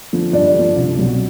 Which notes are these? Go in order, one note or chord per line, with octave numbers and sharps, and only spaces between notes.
D3 F3
G2 D4 D5
D3 F3
C2
B2 F#3